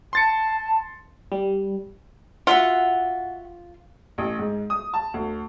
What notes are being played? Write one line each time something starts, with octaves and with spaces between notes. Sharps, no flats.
A5 C6 A6 C#7
G3
F4 F#4 E5 F#5
A1
G#2
D#6
A5
D2